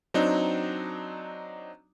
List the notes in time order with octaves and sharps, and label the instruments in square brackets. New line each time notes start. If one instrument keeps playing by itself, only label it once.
[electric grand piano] F#3 C4 D4 D#4